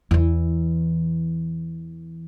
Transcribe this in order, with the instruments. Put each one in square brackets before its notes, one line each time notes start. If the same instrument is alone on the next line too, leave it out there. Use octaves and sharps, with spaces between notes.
[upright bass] E2 E3